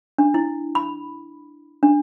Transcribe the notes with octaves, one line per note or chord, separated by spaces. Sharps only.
D4
E4
B5
D4